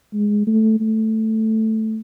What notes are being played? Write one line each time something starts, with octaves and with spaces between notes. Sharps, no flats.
G#3
A3
A3